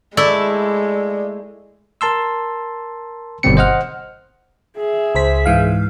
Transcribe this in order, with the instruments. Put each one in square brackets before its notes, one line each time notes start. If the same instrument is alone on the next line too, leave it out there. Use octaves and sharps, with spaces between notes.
[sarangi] G#3 [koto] A3 E4 [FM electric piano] D5
[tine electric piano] A#4 A5 C6 E6
G1 B2 D#3 G3 C4 C#7
C5 D#5 F#5 F6
[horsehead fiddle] G#4 E5
[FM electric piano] C#2 C5 B6
G#2 E3 F5